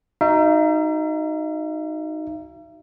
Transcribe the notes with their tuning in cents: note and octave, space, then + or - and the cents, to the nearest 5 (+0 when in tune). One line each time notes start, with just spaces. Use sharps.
D#4 +0 F#4 +0 E5 +45